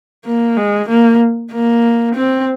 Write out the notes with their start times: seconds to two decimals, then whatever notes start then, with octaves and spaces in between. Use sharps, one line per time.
0.25 A#3
0.57 G#3
0.89 A#3
1.52 A#3
2.15 C4